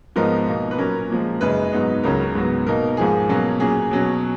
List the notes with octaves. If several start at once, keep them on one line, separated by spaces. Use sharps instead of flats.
G#2 F3 B3 D#4 A#4
B2 A#3 D#4
B4
A#2 F#3 C#4 A#4
A#2 F3 G#3
F#2 C#3 G#3 D#4 B4
G#2 F#3 B3 D#4
C#2 C#3 F#3 C#4 A#4
G#2 F#3 B3
B2 A#3 D#4 A#4
G#2 F3 A#3 G#4
B2 F#3 A#3 C#4
A#2 F#3 C#4 G#4
B2 F#3 C#4